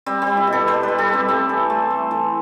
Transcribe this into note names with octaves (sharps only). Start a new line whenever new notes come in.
G3 C4
C4
G3
E4
B2
A4
G3 C5
G3 B4
A4
G3 C4
A2 C4
E3
A3
A3
E3